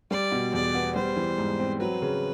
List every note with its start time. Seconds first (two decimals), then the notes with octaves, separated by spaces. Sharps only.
0.11 G3 D5
0.32 B2
0.53 E2 D5
0.74 B3
0.96 G3 C5
1.17 E3
1.38 G#2
1.59 C4
1.80 F#3 B4
2.02 C#3